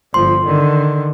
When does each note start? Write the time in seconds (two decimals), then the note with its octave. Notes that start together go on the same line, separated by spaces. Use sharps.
0.14 G1 F3 C6
0.46 D3 D#3